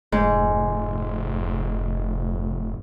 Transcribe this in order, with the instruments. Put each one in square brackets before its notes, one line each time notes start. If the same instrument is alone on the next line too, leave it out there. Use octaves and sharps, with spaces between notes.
[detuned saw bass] F1 [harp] G#2